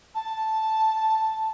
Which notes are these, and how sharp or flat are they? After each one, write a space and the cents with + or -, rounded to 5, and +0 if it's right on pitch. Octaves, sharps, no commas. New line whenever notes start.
A5 +0